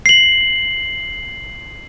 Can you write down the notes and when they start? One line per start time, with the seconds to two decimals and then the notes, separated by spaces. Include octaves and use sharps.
0.06 C7 F#7